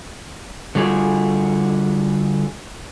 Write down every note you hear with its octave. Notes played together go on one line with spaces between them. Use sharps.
D3 G3 F4 F#4 G#4